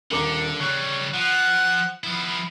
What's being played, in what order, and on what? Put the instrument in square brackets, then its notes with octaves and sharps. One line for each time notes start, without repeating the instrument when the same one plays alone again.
[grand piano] D#1 A#4 D6 [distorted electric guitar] D3
[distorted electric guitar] C#3 G3 [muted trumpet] C#5 [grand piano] F#6
[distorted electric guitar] F3 [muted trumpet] F#5
[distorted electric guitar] F3 E4 [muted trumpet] B3